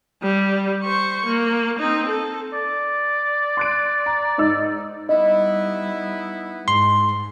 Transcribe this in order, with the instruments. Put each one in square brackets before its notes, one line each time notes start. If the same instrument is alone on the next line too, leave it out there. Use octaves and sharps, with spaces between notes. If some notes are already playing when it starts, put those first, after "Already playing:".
[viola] G3
C5 C#6
A#3
C4 D#4
A4
[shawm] D5
[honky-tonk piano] C6 F#6 D7
A#5
G#2 D#4 E6
[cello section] G3 [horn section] B3 D#4 E4 [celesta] D#5
[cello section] G#2 [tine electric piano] C6